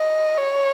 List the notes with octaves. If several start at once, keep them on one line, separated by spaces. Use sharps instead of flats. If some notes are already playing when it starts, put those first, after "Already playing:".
Already playing: D#5
C#5